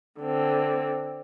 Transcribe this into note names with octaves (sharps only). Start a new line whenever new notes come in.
D3 C4